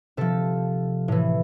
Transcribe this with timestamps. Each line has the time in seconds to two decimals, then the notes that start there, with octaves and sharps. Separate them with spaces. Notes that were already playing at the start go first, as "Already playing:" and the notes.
0.17 C3 F3 A4
1.08 A2 E3